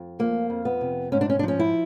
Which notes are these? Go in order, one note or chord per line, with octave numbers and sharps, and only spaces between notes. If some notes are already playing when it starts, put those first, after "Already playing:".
Already playing: F2
F3 A#3
F2
B3
C3
G#2 C#4
D4
C#4
D4
F3 C#4
E4